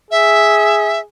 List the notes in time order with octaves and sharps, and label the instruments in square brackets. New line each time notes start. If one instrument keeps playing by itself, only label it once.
[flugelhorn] G#4 [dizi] E5